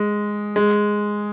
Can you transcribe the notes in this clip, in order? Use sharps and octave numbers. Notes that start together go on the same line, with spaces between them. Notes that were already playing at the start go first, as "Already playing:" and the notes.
Already playing: G#3
G#3